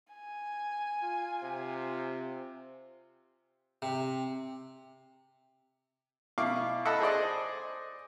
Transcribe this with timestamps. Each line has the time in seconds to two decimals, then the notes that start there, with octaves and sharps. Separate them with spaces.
0.13 G#5
1.03 F4
1.43 C3
3.82 C3
6.38 B2 E4 F5 C#6 D6
6.85 A4 D#5 E5 F#5 A5 B5
7.00 G#4 C5 D5 D#5